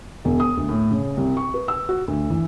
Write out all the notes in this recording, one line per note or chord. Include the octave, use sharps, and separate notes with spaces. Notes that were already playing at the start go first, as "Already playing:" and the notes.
E1
D#6
D2
A2
C#3
C2
C#6
B4
E6
F#4
D2
E3